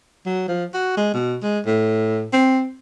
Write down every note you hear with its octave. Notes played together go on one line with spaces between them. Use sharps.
F#3
F3
F#4
G#3
B2
G#3
A2
C4